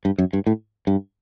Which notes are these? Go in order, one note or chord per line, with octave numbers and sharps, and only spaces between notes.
G2
F#2
G2
A2
G2